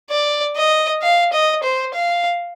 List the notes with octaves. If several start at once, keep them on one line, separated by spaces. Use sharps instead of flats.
D5
D#5
F5
D#5
C5
F5